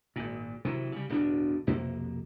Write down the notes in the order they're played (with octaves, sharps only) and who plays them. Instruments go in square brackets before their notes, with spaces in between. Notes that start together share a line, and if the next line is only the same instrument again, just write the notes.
[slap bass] G#1 A#2
C3 D#3 E3 F#3
C#3 G3
D1 E2 B2 D4
B1 F2 C3 A#3